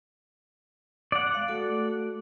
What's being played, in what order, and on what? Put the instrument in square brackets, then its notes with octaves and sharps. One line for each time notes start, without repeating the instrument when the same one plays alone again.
[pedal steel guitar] D5 F#5
[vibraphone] G#3 F5
A3 F#4 A4